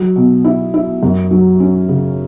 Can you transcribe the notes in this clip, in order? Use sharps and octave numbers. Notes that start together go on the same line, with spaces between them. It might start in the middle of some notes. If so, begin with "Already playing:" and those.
Already playing: F#3
B2
E4
E4
F#2
F#3
C#4
C#3